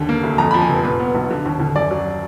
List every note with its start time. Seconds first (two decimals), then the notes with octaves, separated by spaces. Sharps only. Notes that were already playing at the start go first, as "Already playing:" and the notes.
Already playing: D#2 D3
0.09 A#3
0.23 D2
0.38 F2 A#5
0.51 F3 B5
0.62 G#5
0.69 F1
0.84 A#2 B4
0.99 B3
1.15 B1
1.31 D3
1.46 D#2
1.60 D#2
1.75 F#2 D5
1.91 F#3